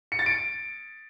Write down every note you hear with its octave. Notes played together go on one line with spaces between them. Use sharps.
C#7
A6
D7